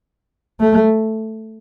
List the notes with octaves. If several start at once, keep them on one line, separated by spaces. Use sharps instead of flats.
A3